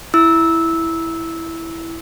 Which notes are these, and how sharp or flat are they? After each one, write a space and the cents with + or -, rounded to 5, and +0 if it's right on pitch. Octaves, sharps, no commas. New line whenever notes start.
E4 +0 E6 -15